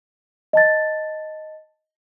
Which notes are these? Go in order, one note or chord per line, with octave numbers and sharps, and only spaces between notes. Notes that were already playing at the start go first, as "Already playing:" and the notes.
D#5 A5 A6